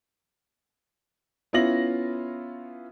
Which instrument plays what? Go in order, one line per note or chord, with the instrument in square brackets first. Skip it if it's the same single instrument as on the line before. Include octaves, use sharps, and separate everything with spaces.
[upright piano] B3 C#4 E4 F4 A#6 F#7